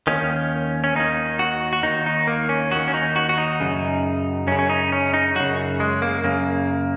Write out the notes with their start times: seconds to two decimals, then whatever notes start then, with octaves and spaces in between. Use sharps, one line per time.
0.07 D#2 D#3 C#4
0.84 C#4
0.96 D#2 D#3 D#4
1.39 F#4
1.73 F#4
1.83 D#2 D#3 D#4
2.06 D#4
2.27 A#3
2.49 C#4
2.71 D#2 D#3 F#4
2.88 C#4
2.94 D#4
3.16 F#4
3.29 F#4
3.38 D#4
3.60 F#2 C#3
4.47 F#2 C#4
4.52 C#3
4.59 C#4
4.70 D#4
4.92 C#4
5.14 D#4
5.35 F#2 C#3 F#4
5.80 G#3
6.02 A#3
6.24 F#2 C#3 A#3